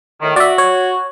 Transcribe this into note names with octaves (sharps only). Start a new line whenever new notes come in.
A2 D#3
F#4 D5 E5
C#5